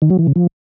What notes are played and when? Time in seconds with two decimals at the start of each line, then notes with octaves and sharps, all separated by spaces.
0.02 D#3
0.10 F#3
0.19 E3
0.27 C#3
0.36 F3